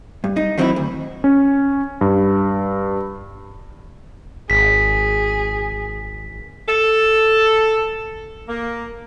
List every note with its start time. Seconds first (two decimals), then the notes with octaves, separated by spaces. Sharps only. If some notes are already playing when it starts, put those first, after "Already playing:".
0.24 G2
0.37 D#4
0.58 D#3 F#3 C4 D#4 E4
0.76 D2
1.24 C#4
2.01 G2
4.50 G#1 G#4 B6
6.69 A4
8.48 A#3